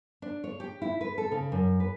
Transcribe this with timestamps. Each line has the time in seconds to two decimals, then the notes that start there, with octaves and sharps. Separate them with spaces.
0.22 D4
0.44 C#5
0.60 G4
0.82 E4
1.01 B4
1.18 A4
1.32 C#3
1.52 F#2
1.80 B4